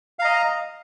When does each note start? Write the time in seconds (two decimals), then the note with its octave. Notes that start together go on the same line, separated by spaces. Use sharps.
0.19 F5
0.22 A#5
0.24 D#5